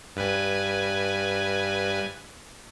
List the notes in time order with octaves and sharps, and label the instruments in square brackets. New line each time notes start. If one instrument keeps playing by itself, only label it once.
[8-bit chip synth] G2 B4 G#5